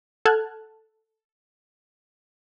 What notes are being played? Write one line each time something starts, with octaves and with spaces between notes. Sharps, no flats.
A4 F#5 A5 F6 F#6 G#6